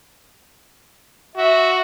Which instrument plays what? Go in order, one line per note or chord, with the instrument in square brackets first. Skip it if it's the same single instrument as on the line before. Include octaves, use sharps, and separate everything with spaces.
[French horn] F#4 [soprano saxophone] E5